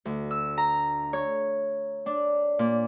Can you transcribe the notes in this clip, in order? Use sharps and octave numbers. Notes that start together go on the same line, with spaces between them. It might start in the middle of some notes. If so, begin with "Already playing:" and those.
D2
E6
A#5
C#5
D4
A#2